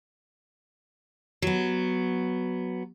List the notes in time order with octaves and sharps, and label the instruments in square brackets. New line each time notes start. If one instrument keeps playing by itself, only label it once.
[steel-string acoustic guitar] F#3 B3